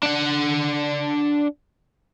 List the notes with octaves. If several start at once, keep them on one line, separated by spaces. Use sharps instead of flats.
D4 F#5